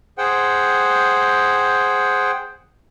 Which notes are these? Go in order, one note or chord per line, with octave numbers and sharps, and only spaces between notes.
G#4 C5 F#5 G5